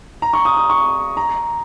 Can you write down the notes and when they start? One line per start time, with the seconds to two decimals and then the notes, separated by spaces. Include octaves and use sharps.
0.22 A#5
0.33 C#6
0.45 D#6
0.57 D#6
0.70 C#6
1.17 A#5